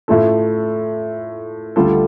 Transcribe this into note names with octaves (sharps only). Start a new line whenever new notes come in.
A2 A3 F4 A4
D2 D3 G3 F4 A4